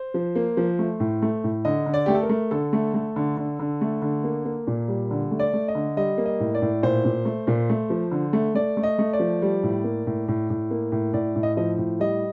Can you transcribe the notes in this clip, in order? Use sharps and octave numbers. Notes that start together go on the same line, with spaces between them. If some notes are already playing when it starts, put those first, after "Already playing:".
Already playing: C5
F3
A#3
F3
A3
A2
A3
A2
D3 D#5
D3
D5
A3 G4
A4
A#4
A3
D3 A4
A3
A3
D3
D3
D3
A3
D3
A#3
A#3
A#2
G3
D3
A3
D5
A3
D#5
D3
G3 D#5
A#3
D#5
A2
D5
A2
A#2 C5
A#2
A3
A#2
A3
F3
D3
A3
A3 D5
A3
D#5
A3
D5
F3
G3
A2
A#3
A2
A2
A2
A#3
A2
A2 D5
A2
D#5
F3 D#5
A2
G3 D#5